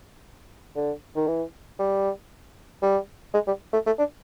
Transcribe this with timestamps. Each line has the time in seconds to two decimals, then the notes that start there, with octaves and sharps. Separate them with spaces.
0.76 D3
1.16 D#3
1.28 E3
1.79 G3
2.82 G3
3.34 G#3
3.47 G3
3.73 A3
3.86 A3
3.99 D4